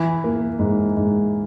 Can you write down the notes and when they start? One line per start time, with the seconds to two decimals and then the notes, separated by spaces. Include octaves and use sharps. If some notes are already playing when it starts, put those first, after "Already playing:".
Already playing: E3
0.24 A#3
0.59 G#2
0.97 G#2